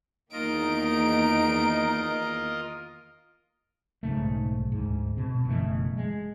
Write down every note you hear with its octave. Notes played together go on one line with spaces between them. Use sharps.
E2 D#3 A#3 D#4 F4 A#4 D#5 D7
B1 G#2 C#3 A3
D2 G#2
B2 C4
F#1 B2 E3 A3
G#3